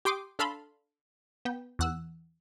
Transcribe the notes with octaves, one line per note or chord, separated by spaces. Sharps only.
G4 G5 C6 D6 D#6
D4 A4 F5 A5 B5 C6
B3 G5
E2 F#5 E6